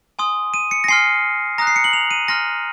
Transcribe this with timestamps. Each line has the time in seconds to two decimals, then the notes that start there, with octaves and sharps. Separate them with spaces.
0.19 G#5 C6 D#6
0.54 D#7
0.71 C#7
0.84 A#6
0.88 G#5 C6 F6 C7
1.58 A#5 D#6 F#6 A#6
1.67 C7
1.76 C#7
1.84 F#7
1.93 F7
2.11 D#7
2.28 G#5 C6 F6 A#6